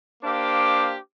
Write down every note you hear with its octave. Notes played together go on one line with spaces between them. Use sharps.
A#3 D4 G4 C5 F5 D6